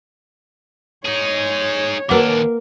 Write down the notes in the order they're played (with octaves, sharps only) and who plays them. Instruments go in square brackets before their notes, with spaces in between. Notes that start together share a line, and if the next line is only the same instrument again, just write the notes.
[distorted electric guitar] D#4 G#4 [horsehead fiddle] C#5
[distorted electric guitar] D#2 D4 [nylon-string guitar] A#3 A#4 [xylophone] B4 F#5 D6